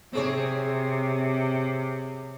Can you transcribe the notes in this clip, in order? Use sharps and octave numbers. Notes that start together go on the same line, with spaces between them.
C3 C4 G#4 C#5